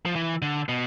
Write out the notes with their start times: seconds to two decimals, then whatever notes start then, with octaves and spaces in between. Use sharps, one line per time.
0.06 F3
0.16 E3
0.42 D3
0.69 B2